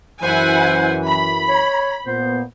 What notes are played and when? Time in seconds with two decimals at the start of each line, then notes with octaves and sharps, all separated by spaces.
0.22 F#2 E3 E4 C5 F#5 G#5
1.07 B5
1.49 C#5
2.07 A#2 B3 C5